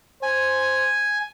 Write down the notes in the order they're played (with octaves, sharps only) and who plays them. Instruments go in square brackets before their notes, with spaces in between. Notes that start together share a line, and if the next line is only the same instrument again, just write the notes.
[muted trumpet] C5 [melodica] G#5